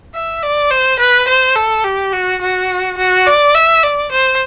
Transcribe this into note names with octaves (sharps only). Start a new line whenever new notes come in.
E5
D5
C5
B4
C5
A4
G4
F#4
F#4
F#4
D5
E5
D5
C5